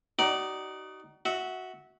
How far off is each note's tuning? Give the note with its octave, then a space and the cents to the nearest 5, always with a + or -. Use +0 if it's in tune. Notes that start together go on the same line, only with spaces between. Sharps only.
D#4 +0 F#4 +40 D5 +0
F#4 +0 E5 -20